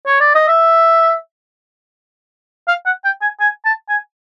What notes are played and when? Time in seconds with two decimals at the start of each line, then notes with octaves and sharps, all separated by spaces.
0.06 C#5
0.20 D5
0.35 D#5
0.48 E5
2.68 F5
2.85 F#5
3.04 G5
3.21 G#5
3.40 G#5
3.65 A5
3.89 G#5